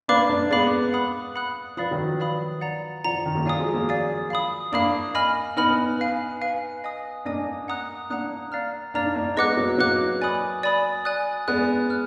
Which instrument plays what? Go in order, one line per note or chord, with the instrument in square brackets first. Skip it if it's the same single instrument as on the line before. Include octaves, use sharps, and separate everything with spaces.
[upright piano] A#3 D4 [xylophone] B4 D5 F5 B5 D6
[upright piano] A#3 D4
[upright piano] G#3 B3 [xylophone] B4 D5 F5 B5 D6
[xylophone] F#5 B5 D#6 F#6
F#5 B5 D#6 F#6
[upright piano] F3 [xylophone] B4 D5 F5 B5 D#6
[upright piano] D#3 F#3
F3
[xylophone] B4 D5 F5 B5 D#6
D5 F#5 A#5
[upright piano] F3 [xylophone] D5 F#5 A#5
[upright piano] F3
D#3
F#3 A#3
[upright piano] F#3 A#3 [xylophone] D5 F5 G#5 D#6
[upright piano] F3 G#3
F#3 A#3
[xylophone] D5 F5 G#5 D#6
F5 B5 D#6
[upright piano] A#3 D4 [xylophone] F5 B5 D#6
[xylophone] D#5 G#5 B5 F6
[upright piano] B3 D#4 [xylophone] D#5 G#5 B5 F6
[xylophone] B4 F5 G#5
B4 F5 G#5
D#5 G#5 D#6
[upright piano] A#3 D4 [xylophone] D#5 G#5 D#6
[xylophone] F#5 A#5 D#6 F#6
[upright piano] A#3 D4 [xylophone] F#5 A#5 D#6 F#6
[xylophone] D5 F5 A#5 F6
[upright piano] A#3 D4 [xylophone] D5 F5 A#5 F6
[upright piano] D#4
A#3 D4
[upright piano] G#3 B3 [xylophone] B4 D#5 F#5 D6 F#6
[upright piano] F#3 A#3
[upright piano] F#3 A#3 [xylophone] B4 D#5 F#5 D6 F#6
[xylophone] D5 G#5 B5 D#6
D5 G#5 B5 D#6
D5 G#5 D#6 F#6
[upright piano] G#3 B3 [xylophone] D5 G#5 D#6 F#6
[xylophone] F6